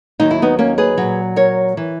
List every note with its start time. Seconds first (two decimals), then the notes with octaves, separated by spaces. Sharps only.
0.20 D#2 D#3 F#3 D#4
0.31 E4
0.42 B3 D#4
0.59 A#3 C#4
0.78 G#4 B4
0.98 A#2 F#3
1.36 A#4 C#5
1.77 E3